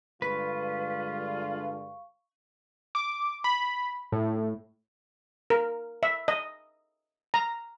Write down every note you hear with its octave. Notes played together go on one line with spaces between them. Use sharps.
G2 D3 G#3 F4 B4 F5 C#6
D6
B5
A2
A#4
E5
D#5
A#5